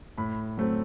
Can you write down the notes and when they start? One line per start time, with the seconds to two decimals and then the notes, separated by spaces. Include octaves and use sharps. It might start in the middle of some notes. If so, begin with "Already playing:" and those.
0.18 A2 B5
0.57 F#3 A3 C4